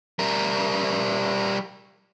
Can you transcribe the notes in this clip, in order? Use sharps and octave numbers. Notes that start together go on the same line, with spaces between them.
G3 A#4